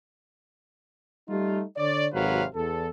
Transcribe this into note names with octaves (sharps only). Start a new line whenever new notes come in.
G3 A3 D#4 F4
D3 C#5 D5
G#1 C3 F#3 B4 F5
E2 A4